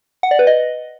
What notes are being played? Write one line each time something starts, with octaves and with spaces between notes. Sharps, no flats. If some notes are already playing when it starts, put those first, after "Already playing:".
F#5
D5
B4
D#5